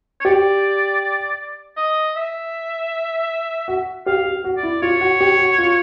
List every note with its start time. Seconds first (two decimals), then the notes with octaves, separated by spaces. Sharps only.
0.20 C#5
0.25 G4 D5
1.77 D#5
2.16 E5
3.68 F#4
4.06 G4 F5
4.25 G4
4.44 F#4
4.57 D5
4.63 E4
4.82 F4 C#5
5.01 F#4
5.21 G4
5.39 F#4
5.58 F4